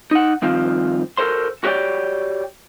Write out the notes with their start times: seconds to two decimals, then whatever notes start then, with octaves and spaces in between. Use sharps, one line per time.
0.11 D#4 F#5
0.42 G2 D#3 F3 C4 F4
1.17 F#4 A4 A#4 C5 C6
1.64 F#4 G4 C#5 D5 G5